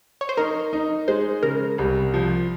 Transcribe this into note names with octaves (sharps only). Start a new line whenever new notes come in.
C#5
C5
D#4 A#4
D#4
G#3 C5
C#3 A#4
C2
F3